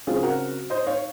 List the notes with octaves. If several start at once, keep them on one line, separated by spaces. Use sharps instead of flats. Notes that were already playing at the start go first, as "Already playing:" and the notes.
C#3 F#3 C4 F4 G#4
F#4 A#4
C5 D#5
C#5 F5